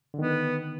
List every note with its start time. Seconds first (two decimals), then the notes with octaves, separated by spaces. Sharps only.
0.14 D3
0.18 D#3 B3